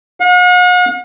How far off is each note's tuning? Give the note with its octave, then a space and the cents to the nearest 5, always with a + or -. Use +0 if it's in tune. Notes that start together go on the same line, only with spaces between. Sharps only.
F#5 -45